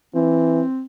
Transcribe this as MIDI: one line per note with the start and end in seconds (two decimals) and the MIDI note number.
0.15 0.63 52
0.15 0.84 60